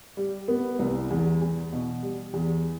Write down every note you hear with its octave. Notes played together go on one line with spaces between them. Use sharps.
G3
B3
C2
E2
E2
B2
G3
E2